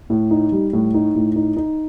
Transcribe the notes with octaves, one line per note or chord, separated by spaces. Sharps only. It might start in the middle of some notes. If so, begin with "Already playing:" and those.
A2
D#4
G3
A2
D#4
A2
D#4
D#4